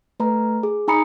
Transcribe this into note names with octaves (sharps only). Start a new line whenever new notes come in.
A3 B4 A#5
G#4
D#4 G#5 A#5 B5 D#6 C#7